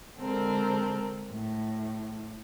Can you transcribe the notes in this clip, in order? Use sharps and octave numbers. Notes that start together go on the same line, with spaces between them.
D3 G#3 C4 A4 A#4
A2